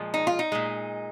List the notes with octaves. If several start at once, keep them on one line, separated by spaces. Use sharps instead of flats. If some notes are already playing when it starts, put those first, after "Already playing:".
Already playing: A#2 F3 G#3
D#4
F4
D#4
A#2 G#3